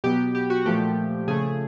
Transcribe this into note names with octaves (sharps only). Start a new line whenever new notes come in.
B2 F#3 B3 G4
G4
G4
F#4
A#2 F3 A3 G4
C#3 F3 A3 G#4